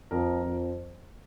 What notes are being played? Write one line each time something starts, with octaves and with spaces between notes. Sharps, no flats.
F2 F3 A#4
F2 F3